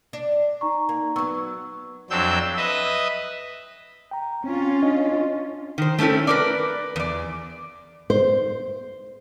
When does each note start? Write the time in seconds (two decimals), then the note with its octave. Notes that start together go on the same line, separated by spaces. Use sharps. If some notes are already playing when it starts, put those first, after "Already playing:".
0.13 D4
0.61 D#4 A#5 C#6
0.89 A#3
1.16 F#3 B3 C#6 E6
2.10 F2 F#3 C4 D4 E6 G6
2.57 B4 D#5 E5 D#6
4.11 G5 A#5
4.44 C4 C#4 F4
4.83 D4 D#5
5.78 D#3 C5
5.99 A3 C4 C#4 E4 A4
6.27 A#4 B4 D5
6.96 E2 D5
8.10 C5